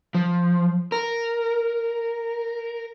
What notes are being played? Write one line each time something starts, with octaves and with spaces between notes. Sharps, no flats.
F3
A#4